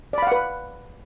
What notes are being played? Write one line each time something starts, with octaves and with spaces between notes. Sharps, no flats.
B4 D5 F5 F#5 B5